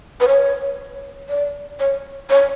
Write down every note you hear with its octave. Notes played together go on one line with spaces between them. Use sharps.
B4
C#5
D5
C#5
C#5